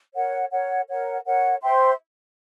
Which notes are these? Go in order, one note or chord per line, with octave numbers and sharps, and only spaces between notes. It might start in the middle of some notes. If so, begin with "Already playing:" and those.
A#4 C#5 F#5
A#4 C#5 F#5
A#4 C#5 F#5
A#4 C#5 F#5
C5 E5 G5 C6